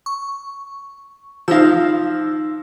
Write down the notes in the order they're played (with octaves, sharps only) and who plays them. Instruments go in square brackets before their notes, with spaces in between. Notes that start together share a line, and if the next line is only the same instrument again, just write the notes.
[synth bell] C#6
[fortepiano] F3 F5 [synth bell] D#4 E6